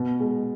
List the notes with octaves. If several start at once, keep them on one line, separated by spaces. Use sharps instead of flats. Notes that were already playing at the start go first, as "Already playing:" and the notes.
Already playing: B2
G#3